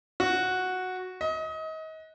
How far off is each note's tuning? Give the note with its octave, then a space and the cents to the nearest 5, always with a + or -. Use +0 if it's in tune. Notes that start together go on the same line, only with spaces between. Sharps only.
F#4 -5
D#5 +30